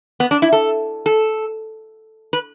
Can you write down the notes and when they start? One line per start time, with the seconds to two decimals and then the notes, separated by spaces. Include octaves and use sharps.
0.20 B3
0.31 D4
0.42 E4
0.52 A4
1.06 A4
2.33 B4